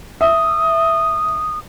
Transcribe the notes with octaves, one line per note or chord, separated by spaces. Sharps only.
E5 D#6